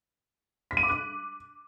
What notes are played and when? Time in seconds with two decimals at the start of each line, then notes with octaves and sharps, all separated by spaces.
0.71 B6
0.77 D#7
0.83 D6
0.89 F#6